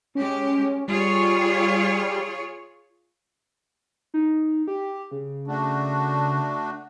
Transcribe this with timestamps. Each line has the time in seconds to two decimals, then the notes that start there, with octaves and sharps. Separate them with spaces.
0.15 G#3 C#4 G4
0.88 G3 F4 G#4 C#5
4.14 D#4
4.67 G4
5.11 C#3
5.47 A3 D4 F#4